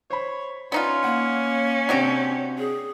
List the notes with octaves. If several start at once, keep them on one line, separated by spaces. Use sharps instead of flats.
C5 C#5 B5
B3 C#4 D#4 F4 D5
A#3 F#5
C3 F#3 C4 D4 F#4 G4
G#4